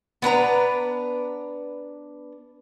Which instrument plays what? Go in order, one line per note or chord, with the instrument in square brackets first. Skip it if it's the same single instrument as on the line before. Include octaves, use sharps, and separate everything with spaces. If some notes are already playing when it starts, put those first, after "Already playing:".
[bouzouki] B3 D4 B4 A#5